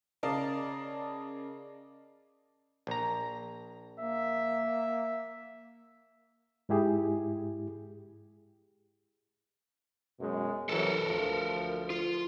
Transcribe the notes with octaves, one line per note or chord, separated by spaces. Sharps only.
C#3 A#4 D5 D#5 F5 A5
A#1 A#5
A#3 E5
G#2 G#3 E4 G4 G#4
F#2 B2 G#3
C2 E3 F#3 A4 A#4
D2 F3
F4